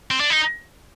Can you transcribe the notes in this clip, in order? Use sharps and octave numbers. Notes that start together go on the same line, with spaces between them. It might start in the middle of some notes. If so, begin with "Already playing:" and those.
C4
D4
D#4